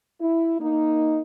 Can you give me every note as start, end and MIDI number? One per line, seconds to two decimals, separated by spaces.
0.21 0.58 64
0.60 1.20 58
0.60 1.20 63